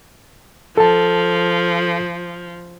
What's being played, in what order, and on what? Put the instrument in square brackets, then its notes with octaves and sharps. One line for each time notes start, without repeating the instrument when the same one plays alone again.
[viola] F3 [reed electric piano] A4 A5